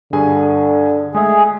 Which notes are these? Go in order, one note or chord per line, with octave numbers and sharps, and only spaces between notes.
G2 D3 G#4 G#5
G#3 A3 G#4 E5